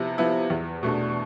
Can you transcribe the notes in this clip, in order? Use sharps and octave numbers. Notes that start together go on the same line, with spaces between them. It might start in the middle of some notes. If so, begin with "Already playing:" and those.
Already playing: C3 F3 B3 E4
F3 B3 E4
E2
B2 A3 D4